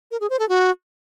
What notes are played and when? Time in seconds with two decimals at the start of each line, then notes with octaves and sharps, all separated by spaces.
0.11 A#4
0.20 G#4
0.30 C5
0.39 A4
0.49 F#4